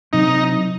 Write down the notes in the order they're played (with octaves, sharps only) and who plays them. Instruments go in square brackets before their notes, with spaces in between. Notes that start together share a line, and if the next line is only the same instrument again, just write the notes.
[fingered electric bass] C3 F#3 C4 [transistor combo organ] D#4